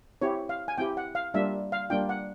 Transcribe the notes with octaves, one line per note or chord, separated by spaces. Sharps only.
C4 E4 G4 C#5
F5
G#5
C4 E4 G4 G5
F#5
F5
G3 A#3 D4 F4 E5
F5
G3 A#3 D4 F4 G5
F#5